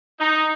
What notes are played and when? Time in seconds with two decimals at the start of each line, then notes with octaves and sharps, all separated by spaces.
0.20 D#4